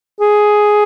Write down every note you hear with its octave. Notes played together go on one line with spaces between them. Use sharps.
G#4